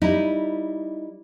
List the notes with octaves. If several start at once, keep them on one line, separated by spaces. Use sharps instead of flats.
G3 D#4 E4